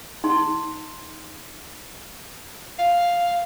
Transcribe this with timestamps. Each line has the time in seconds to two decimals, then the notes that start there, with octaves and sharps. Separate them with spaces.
0.24 D#4 C6
2.79 F5